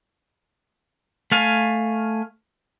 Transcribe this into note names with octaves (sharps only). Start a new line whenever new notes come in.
A3 F5 G#5